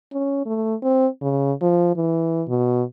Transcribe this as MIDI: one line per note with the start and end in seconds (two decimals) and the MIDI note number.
0.13 0.42 61
0.46 0.75 57
0.83 1.07 60
1.21 1.53 49
1.62 1.95 53
1.96 2.43 52
2.48 2.83 47